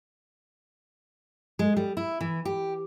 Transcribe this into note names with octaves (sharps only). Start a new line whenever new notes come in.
G#3
G3
E4
E3
G4